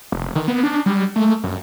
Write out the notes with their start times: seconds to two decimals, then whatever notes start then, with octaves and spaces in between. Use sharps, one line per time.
0.12 F1
0.35 D#3
0.48 B3
0.63 D4
0.86 G3
1.16 A3
1.44 F#2